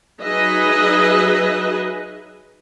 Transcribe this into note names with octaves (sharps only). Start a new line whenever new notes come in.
F#3 D#4 G#4 B4 D#5 E5